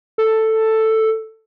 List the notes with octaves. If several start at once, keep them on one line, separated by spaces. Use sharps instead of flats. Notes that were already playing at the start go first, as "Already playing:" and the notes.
A4